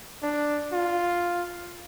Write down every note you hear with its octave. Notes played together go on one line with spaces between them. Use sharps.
D4
F4